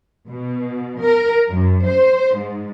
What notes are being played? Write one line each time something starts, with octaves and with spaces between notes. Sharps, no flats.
B2
A#4
F#2
C5
G#2